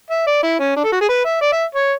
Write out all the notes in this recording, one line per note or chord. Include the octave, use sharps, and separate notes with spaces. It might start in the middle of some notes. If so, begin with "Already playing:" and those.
E5
D5
E4
C#4
D4
A4
F#4
G#4
B4
E5
D5
E5
C#5